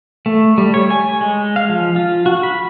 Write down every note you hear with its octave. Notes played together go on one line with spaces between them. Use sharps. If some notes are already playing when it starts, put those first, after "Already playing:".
A3
G3
C#5
G#5
G#3
F5
F3
F4
F#4
B5